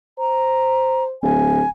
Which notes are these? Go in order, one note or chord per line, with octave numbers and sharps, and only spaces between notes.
C5 A#5
D1 G#5